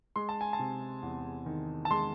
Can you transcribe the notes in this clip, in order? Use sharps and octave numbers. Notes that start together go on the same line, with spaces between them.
G#3 C6
A5
G#5
A5
C3
E2
D#3
A5
G#3 C6